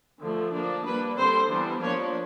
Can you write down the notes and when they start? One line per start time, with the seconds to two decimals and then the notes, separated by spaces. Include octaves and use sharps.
0.22 D3 F3 A3
0.54 F3 A#3 D4
0.86 G3 A#3 D4 B4
1.17 D3 G3 C4 C5
1.49 E3 G3 B3 D4
1.81 F3 A#3 D4 C#5